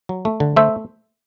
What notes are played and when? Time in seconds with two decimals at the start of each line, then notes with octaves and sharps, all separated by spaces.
0.09 F#3
0.25 A3
0.40 D3
0.56 A3 C5 E5